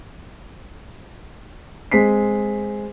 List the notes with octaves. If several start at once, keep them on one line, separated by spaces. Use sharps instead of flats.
G#3 C4 B6 C7